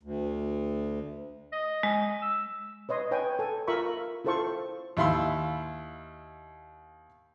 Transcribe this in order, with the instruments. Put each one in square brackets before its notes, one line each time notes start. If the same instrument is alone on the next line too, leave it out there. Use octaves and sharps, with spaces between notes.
[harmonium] D2
[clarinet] D#5
[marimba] G#3
[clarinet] E6
[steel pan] B4 C#5 D#5 C6
B4 C#5 G5 G#5
A4 G#5
F4 A#4 E5 B5 C#6
E4 F4 A4 C5 F5 C#6
[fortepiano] D#2 E4 F5 B5 C6 E6